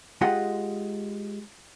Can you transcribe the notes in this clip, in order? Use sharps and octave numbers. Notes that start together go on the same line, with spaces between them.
G#3 F4 G4 D#5 F#5